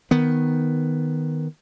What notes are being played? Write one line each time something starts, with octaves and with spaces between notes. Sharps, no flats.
D#3 B3